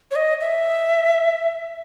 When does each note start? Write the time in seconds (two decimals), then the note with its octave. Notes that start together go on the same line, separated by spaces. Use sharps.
0.11 C#5
0.16 D#5
0.41 E5